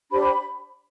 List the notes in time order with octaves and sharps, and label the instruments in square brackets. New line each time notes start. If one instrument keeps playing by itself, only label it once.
[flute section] D4 G4 C5 B5